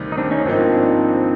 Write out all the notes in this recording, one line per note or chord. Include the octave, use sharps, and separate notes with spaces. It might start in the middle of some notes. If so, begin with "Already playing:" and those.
Already playing: D2 C3 D#3 G3
D#4
C4 D4
C#4 D#4
G#1 G#2 F3 A#3 C4 D4 D#4